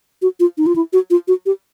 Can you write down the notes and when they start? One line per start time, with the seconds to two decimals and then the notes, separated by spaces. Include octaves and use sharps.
0.22 F#4
0.40 F4
0.58 D#4
0.66 F4
0.76 E4
0.93 F#4
1.10 F4
1.28 F#4
1.46 G4